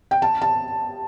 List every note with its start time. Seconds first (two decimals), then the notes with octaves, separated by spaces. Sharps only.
0.11 G5
0.22 A5
0.42 A5